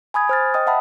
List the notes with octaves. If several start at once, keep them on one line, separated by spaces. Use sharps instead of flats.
G#5 B5 D#6 G#6
C5 F6 A6
D#5 G5 D#6
E5 F#5 G5 A5 B5